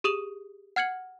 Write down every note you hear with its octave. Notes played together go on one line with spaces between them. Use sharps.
G4 G#4 D#6 F7 F#7
F#5 F6 G#6 C#7 F#7